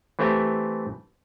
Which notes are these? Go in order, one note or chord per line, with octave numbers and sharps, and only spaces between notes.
E3 A3 C4 G4 E5 A#5